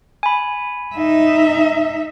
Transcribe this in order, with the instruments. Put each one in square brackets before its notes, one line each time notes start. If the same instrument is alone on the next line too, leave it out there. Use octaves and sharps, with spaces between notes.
[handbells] G#5 B5
[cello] D#4 E5